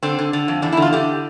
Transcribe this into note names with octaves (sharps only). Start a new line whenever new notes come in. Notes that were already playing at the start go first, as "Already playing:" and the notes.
D3 C4
D3
D3
F2
E2 D4
E4
D3
F4
D3 G4